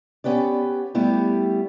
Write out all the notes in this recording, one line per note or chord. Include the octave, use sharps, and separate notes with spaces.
B3 C#4 G4 B4 D5
G3 A3 B3 E4 G4